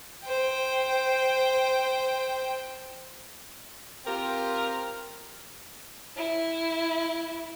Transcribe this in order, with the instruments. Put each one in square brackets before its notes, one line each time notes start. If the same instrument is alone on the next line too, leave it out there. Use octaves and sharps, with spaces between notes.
[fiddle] C5 G5
[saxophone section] C4 F4 G4 A#4
[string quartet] E4